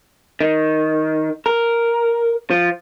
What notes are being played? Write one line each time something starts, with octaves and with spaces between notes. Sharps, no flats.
D#3
A#4
F3